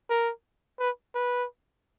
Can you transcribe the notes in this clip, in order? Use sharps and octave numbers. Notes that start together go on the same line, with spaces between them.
A#4
B4
B4